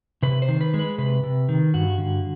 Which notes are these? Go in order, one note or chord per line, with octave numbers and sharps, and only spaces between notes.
C3 B4
C5
D#3
B4
G#3
B4
C3 B4
C3
D#3
G2 F#4
D3